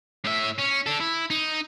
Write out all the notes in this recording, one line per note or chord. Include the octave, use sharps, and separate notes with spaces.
A2 E5
C#4
D4 A4
E4
D#4